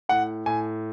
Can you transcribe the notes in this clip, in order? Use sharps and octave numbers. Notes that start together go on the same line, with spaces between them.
A2 F#5
A2 G#5